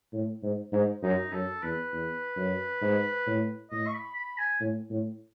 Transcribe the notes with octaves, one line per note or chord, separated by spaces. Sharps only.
A2
G#2
G#2
F#2 D#4
F#2 A4
E2 B4
E2
F#2
G#2
A2
A2 D#5
C#6
B5
B5
G#5
A2
A2